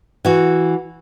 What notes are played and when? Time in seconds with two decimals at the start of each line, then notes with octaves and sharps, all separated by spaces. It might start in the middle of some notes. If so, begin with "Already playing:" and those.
0.25 E3 F#4